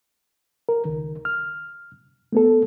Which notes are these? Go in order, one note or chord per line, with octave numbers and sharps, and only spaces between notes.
A#4
C#2 D#3
F6
A3 B3 A4